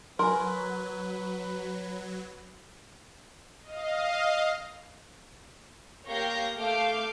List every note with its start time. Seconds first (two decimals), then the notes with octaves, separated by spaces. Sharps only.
0.19 F#3 A#4 B4 G#5 B5 C6
3.63 D#5 F5
6.06 A#3 G4 C#5 F5 G6 A#6
6.58 A3 F5 D6 G6